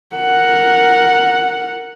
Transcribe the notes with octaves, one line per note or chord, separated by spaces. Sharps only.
A#4 F#5